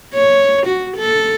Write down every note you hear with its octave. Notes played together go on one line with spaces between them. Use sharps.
C#5
F#4
A4